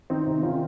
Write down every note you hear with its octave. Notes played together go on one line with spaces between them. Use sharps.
D#3 C4 D#4
C3 C4 D#4
D#3 C#4 F4